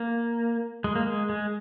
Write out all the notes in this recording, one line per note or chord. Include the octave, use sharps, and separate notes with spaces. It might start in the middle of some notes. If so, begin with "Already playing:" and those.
Already playing: A#3
G#3
A#3
G#3
G#3